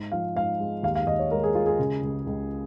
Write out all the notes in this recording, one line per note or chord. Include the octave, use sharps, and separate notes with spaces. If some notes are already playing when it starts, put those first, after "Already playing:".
Already playing: G#2
F3 F5
G#2 F5
G#3
D#2 F5
F5
D#2 D#5
C#5
G#3 A#4
G#4
G#3 F4
G#4
C#3
C#2
C#2